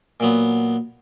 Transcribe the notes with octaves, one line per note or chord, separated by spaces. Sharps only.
A#2 F#3 B3